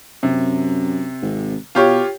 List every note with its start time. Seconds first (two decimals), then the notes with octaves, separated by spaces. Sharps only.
0.23 F#2 C3
1.22 G#1
1.75 B2 F4 G4 C#5